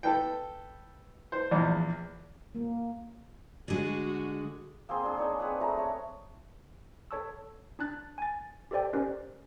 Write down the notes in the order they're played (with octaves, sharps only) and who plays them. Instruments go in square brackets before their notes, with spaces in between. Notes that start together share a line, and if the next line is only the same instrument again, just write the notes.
[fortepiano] A4 B4 G5
C5
A#1 E2
[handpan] A#3
[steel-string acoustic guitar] D3 G#3 [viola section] F#4
[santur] A#3 C4 G#4 C6
D4 G#4
D4 D#4 C#5
C4 B4 F#5
A3 G#4 A#5
A3 C#5
[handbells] A4 C#5 A5 C#6 E6
D4 A5 F#6 A6
G#5 A6
G4 A4 C5 D5 G5
C#4 G4 A#4 C5 D5